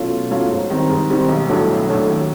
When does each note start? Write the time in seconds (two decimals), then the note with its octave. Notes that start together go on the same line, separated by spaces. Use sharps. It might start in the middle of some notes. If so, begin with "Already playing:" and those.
Already playing: B2 F#3 A3 C#4 F4
0.11 B2
0.31 F#3 A3 C#4 F4
0.51 G#2
0.70 D#3 G3 C4
0.89 G#2
1.10 D#3 G3 C4
1.29 B1
1.49 A2 F#3 A3 D4
1.68 B1
1.88 A2 F#3 A3 D4
2.08 D#2